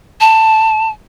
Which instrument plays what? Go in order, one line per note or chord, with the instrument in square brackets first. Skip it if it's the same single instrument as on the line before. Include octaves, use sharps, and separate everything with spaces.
[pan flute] A5